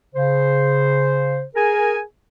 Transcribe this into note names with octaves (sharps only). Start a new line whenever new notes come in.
C#3 C5
G#4 A#4 G#5